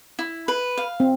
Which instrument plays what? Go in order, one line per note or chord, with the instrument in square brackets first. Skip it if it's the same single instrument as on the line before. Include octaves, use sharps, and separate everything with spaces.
[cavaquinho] E4
B4
F5
[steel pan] C4